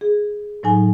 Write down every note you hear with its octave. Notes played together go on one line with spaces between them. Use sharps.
G#4
A2 F#3 D#4 G#5